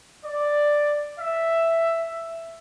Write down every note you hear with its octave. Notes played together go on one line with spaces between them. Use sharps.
D5
E5